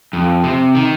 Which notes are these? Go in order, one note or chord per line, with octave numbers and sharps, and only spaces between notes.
F2
C3
D#3